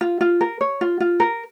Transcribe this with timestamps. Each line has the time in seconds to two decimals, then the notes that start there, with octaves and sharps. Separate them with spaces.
0.01 F4
0.21 F4
0.41 A#4
0.61 C#5
0.81 F4
1.00 F4
1.20 A#4